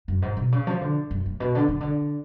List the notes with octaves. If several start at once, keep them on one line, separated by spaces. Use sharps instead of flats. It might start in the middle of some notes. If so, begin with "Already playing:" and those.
F#2
G#2
B2
C#3
F3
D3
F#2
A2
B2
D3
C#3
D3